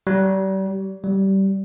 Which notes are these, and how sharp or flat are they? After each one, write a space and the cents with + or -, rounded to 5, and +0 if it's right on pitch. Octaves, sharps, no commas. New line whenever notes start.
G3 -35
G3 -20